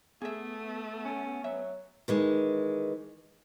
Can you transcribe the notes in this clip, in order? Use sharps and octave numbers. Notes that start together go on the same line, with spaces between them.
A3 B3 G#4 E5
C#4
F#3 E5
D#3 E3 G#3